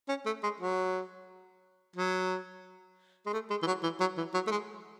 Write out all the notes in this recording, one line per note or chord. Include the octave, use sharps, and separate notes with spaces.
C#4
A3
G#3
F#3
F#3
G#3
A3
G#3
E3
F#3
E3
F#3
E3
F#3
A3
G#3